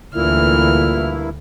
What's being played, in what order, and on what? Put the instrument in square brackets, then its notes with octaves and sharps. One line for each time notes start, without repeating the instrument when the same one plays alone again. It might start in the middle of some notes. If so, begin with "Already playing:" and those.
[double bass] D2 [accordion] G2 A#3 E4 [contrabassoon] A#2 [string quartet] E3 F6